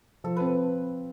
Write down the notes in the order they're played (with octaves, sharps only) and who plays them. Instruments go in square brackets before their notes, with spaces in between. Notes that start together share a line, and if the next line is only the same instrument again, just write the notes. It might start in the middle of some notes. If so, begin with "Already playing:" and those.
[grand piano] F3 [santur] A4
[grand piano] C4 [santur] B4